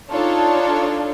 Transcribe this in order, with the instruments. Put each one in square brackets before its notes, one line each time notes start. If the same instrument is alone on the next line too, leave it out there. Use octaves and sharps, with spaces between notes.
[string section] D4 D#4 F4 A4 C#5